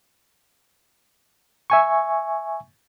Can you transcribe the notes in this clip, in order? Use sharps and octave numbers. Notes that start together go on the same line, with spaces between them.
E5 G#5 C#6